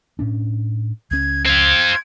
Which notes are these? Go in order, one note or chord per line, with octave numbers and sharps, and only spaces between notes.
A2 C#4 D4
C#2 C#4 G#6
C4 F4 G#6